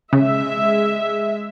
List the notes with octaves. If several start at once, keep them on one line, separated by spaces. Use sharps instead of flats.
C#3 G#3 E5